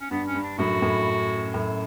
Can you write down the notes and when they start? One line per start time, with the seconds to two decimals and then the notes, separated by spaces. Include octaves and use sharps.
0.01 C#4
0.11 G2 B3
0.27 C#4
0.35 G2
0.43 D4
0.58 F#2 A2 F#4
0.82 F#2 A2
1.54 F#2 A2